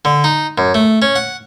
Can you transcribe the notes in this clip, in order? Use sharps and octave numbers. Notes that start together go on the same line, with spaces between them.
D3
D#4
F#2
A3
C#4
F#5